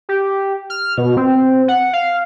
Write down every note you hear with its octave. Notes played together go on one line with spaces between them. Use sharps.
G4
F6
B2
C4
F#5
F5